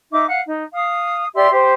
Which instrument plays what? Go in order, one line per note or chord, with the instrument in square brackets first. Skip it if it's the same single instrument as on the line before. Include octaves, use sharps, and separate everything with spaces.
[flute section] D#4 E5 D6
F5 F#5
D#4
F5 D#6
G4 D5 E5 C6
G4 C5